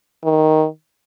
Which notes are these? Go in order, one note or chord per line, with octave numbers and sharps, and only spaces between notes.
D#3